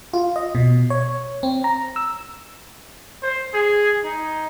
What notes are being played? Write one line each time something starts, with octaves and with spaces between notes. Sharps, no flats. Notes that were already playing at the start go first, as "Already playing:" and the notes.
F4
D#5
B2
C#5
C4
A#5
E6
C5
G#4
D#4